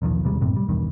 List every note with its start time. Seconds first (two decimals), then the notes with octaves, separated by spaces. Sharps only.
0.02 B1 E2 D#3 F3
0.24 D#2 C3 G3 G#3
0.41 F#2 A2 C3
0.56 G3
0.69 B1 E2 G2 D#3